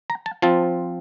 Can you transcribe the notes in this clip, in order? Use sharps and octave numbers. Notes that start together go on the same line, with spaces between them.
A#5
A5
F3 C4 F4 A5